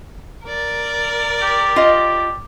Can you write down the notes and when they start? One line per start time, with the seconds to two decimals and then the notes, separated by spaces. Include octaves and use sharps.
0.45 A#4 D5
1.42 G4
1.76 F4 D#5